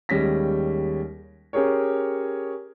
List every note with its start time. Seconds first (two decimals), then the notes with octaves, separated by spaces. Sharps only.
0.09 D#2 G3 G#3 C#4 A#6 B6
1.53 C#4 G4 G#4 A#4 C#5